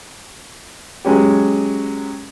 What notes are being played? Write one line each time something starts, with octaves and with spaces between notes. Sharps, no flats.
F#3 G#3 C#4 G4